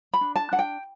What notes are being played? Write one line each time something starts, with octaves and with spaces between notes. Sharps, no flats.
B5
D4
A5
D4 F#5
G5